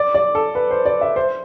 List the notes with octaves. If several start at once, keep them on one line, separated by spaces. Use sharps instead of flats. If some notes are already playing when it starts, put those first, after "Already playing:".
Already playing: D5
D5
A4
B4
C5
D5
E5
C5